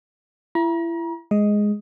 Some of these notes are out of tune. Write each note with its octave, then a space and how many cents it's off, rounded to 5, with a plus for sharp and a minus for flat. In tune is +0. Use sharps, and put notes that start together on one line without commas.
E4 +30 A#5 +40
G#3 +0 D#5 +5